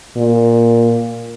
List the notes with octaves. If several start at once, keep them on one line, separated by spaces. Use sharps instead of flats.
A#2